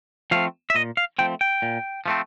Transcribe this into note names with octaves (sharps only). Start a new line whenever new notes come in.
F3 A3 C4 F5
E5
A#2 D#5
F5
F3 A3 C4 G5
G5
A#2
F3 A3 C4